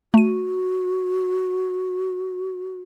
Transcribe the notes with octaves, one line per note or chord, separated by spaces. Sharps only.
A3 F#4 D#7